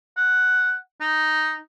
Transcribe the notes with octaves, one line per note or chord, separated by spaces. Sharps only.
F#5
D#4